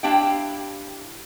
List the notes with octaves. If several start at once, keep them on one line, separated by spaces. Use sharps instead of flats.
D4 E4 G4 F5 G5